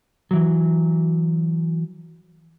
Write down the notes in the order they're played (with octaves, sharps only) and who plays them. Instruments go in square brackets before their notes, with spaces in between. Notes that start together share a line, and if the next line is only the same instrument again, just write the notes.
[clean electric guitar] E3 F#3